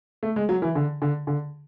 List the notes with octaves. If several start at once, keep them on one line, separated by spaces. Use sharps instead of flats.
A3
G#3
F#3
E3
D3
D3
D3